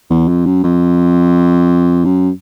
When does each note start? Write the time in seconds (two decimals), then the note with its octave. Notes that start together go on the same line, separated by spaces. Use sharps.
0.10 E2
0.28 F2
0.46 F#2
0.64 F2
2.05 F#2